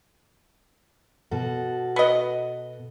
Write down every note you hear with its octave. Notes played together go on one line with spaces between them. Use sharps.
B2 F#4 A4
B3 D#5